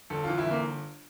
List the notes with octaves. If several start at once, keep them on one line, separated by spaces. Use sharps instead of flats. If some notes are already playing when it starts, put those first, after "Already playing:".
G1 A4
E3 F4
E4
G1 A#3